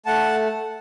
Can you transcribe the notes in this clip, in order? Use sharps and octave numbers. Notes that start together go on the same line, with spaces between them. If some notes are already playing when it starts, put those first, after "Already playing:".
A3 F#5 A5